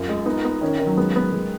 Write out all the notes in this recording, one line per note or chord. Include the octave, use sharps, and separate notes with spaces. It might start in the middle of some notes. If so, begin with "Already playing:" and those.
Already playing: F#2 F4
G#3
B3 D#4
B3
D#3 C#4
D#3
F#3
G#3 B3
B3
G#3